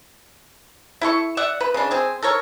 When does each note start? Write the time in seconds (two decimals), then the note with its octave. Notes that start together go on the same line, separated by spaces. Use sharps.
1.01 E4 A4 C#6
1.37 D5 E5 F#5
1.61 B4
1.74 C#3 D4
1.91 C4 G#4
2.23 A4 A#4 C#5